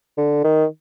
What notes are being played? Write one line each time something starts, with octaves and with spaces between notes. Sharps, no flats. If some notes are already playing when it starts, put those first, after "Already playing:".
D3
D#3